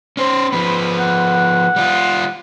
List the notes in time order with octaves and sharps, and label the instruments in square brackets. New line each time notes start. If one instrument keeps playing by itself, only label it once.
[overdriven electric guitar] C#4 C5
[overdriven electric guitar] F3 B3 [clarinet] B5
[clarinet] F#5
[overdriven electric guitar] G3 F4